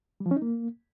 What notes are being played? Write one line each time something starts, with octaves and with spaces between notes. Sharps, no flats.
G3
F3
C#4
D#4
A#3